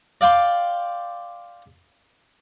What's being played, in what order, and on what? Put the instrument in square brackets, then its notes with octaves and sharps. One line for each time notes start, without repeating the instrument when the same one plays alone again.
[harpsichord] D5 F5 G5 C6